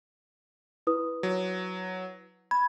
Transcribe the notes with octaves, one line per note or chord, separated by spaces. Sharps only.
E4 B4 D#6
F#3
B5 G#6